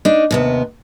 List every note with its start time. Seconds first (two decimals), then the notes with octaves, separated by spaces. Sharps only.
0.05 D4 D#4
0.31 D#2 C3 B3